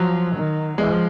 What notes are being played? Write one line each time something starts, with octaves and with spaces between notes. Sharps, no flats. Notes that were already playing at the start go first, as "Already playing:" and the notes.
Already playing: F3 F#3
D#3
F3 G#3